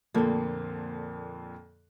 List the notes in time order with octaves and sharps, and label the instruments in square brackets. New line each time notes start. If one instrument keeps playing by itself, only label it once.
[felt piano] F2 A#2 D3 [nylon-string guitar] A#3 C4